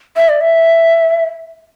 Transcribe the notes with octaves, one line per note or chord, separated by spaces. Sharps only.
E5
D5
E5